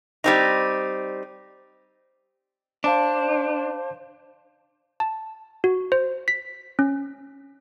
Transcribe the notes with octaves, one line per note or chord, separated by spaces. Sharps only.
G3 C4 D#4
D4 C5 F5 A5 D6
A5
F#4
C5
B6
C#4